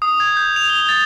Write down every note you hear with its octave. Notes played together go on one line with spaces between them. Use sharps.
D#6
G#6
G6
F7
G7
A6